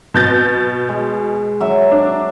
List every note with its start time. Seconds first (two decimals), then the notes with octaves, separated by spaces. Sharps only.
0.14 B2 G6 A6
0.89 G#3
1.60 F#3 E5
1.91 D4